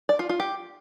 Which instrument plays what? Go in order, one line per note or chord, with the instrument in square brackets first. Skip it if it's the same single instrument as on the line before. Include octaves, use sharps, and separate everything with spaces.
[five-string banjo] D5
F4
F4
G4